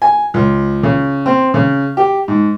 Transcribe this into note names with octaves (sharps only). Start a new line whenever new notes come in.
G#5
C#2
C#3
C4
C#3
G4
G#2